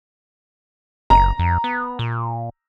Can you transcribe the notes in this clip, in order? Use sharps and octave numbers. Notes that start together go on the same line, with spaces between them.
F#1 A#5
F2
B3
A#2